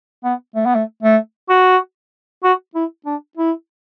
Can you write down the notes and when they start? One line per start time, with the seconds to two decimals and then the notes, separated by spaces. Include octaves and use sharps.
0.24 B3
0.55 A3
0.66 B3
0.75 A3
1.03 A3
1.49 F#4
2.43 F#4
2.75 E4
3.06 D4
3.37 E4